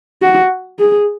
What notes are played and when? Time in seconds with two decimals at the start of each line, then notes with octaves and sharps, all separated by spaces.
0.22 F#4
0.79 G#4